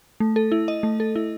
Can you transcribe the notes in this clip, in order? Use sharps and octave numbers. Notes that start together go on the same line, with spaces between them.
A3
A4
E4
D#5
A3
A4
E4